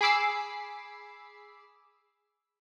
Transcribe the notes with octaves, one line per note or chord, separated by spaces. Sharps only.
G#4 B5 D6 E6 C7